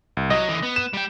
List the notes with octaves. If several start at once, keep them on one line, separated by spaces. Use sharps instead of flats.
C2
F#3 D#5
D3 E3
B3
E7
G3 G5